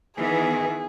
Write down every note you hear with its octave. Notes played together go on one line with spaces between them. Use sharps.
D#3 E3 B3 G#4